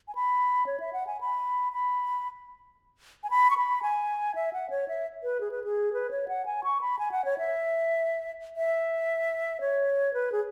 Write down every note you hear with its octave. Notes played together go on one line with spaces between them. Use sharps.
G#5
B5
C#5
E5
F#5
G#5
B5
B5
G#5
B5
C#6
B5
G#5
E5
F#5
C#5
E5
B4
G#4
B4
G#4
B4
C#5
F#5
G#5
C#6
B5
G#5
F#5
C#5
E5
E5
C#5
B4
G#4